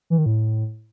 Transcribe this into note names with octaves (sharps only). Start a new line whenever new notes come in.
E3
D#3
A2